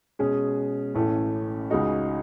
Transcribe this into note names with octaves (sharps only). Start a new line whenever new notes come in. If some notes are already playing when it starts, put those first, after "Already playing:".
B2 G#3 C#4 G#4
A1 A2 E3 A3 C#4
C#2 C#3 G#3 D#4 F#4